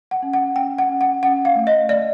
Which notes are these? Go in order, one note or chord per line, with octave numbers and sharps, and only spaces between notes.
F#5
C#4
F#5
C#4 G5
F#5
C#4
F#5
C#4 F#5
F5
A3
D#5
A3 D5